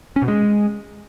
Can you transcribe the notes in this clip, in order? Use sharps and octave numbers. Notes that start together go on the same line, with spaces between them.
C#4
B2
G#3